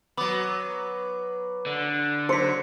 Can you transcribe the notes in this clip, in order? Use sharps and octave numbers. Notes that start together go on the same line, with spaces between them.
F#3 B3 B5 D6
D3
F#3 C5 B6 C#7